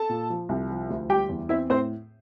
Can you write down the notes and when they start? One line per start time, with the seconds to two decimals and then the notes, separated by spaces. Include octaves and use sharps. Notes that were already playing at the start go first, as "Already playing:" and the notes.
Already playing: A4 A5
0.09 A#2
0.30 F3
0.49 C2
0.70 F3
0.90 D2
1.09 G3 G4 G5
1.29 E2
1.49 C4 E4 E5
1.70 A2 C4 C5